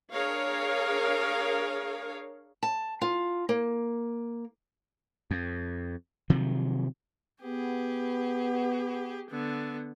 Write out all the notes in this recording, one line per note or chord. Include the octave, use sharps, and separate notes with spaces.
D4 G#4 A#4 C#5 F5
A5
F4
A#3
F2
C3 D#3 F3 F#3
B3 G4 G#4
D3 B3